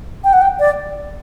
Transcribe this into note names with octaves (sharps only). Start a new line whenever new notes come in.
G5
F#5
G5
D5